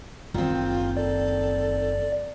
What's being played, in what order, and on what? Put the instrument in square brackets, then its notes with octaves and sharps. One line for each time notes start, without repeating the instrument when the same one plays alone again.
[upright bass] F#1 [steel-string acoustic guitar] D#3 C4 [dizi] F4
[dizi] A4 [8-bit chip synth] D5